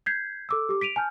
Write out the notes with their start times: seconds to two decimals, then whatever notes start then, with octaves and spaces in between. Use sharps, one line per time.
0.06 G6 G#6 B6 C7
0.49 A4 D6 E6
0.69 G4 D6
0.81 B6 D7 D#7 F7
0.96 G#5 A5 F6 G6